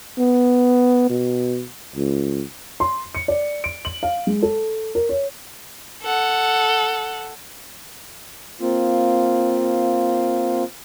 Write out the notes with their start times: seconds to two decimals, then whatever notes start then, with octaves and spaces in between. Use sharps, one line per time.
0.18 B3
1.10 B2
1.96 C#2
2.80 C6
3.15 C#7
3.28 D5
3.64 D7
3.85 F#7
4.03 F5
4.27 G#3
4.43 A4
4.95 A#4
5.09 C#5
6.03 A4 F#5
8.61 A#3 C4 F4